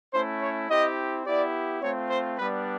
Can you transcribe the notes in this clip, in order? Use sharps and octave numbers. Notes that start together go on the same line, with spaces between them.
A3 C#4 E4 C5
C#5
C4 E4 G4 D#5
B3 E4 G4 D5
A3 C4 F4 C#5
C5
G3 B3 D4 B4